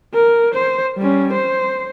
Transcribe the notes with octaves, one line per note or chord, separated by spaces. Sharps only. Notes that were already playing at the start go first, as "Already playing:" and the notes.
A#4
C5
G3 C#4
C5